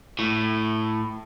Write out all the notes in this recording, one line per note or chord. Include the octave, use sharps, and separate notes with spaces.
A2